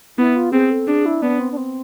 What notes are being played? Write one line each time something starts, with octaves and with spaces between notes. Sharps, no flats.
B3 E4
F4
C4 G#4
A4
D4 G#4
E4
B3 D4
C4
D4
C4